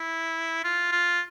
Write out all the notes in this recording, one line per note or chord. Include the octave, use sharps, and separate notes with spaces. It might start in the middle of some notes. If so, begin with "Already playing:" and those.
Already playing: E4
F4
F4